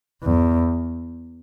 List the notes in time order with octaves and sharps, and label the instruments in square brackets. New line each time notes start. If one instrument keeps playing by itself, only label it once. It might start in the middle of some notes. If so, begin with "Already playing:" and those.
[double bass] E2